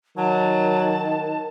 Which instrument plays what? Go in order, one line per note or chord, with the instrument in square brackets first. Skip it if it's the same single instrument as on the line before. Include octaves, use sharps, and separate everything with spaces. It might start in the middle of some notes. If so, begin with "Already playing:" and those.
[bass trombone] D#3 [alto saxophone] F#3 [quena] A5